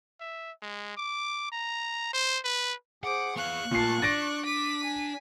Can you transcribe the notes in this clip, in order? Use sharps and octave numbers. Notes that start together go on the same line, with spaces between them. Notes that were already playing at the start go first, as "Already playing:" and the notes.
E5
G#3
D6
A#5
C5
B4
G#4 C5 F#5 D6
B3 G#4 F5 C#6 F#6
A#2 A3 A#3 F4 A5 C7
D4 D5 A6 A#6 D7
D6 B6 D#7
G#5